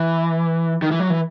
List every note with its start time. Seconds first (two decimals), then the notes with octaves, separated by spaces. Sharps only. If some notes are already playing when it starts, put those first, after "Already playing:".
Already playing: E3
0.82 D#3
0.91 E3
1.00 F#3
1.10 E3